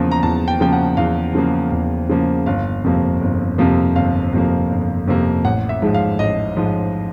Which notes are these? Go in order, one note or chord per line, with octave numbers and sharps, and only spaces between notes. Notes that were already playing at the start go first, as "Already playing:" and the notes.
Already playing: E2 C#3 F3 A#3
A#5
E2 A5
G5
C#3 F3 A#3 G5
F#5
E2 F5
C#3 F3 A#3
E2
C#3 F3 A#3
G1 F5
F2 C3 F3 A#3
G1
F2 C3 F3 A#3
G1 F5
F2 C3 F3 A#3
G1
F2 C3 F3 A#3
A1 F#5
E5
G#2 F3 G#3
F5
A1 D#5
G#2 F3 G#3